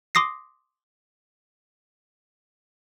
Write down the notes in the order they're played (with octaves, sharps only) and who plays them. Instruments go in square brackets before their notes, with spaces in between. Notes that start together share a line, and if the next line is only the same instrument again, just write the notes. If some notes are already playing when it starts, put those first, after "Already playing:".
[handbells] C6 D6 D#6 A#6 C7